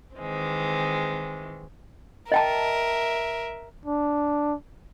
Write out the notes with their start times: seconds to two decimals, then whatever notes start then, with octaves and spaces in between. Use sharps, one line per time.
0.17 D#3 E3 G#3 C4
2.32 A#4 D#5 E5 G5 A5
3.86 D4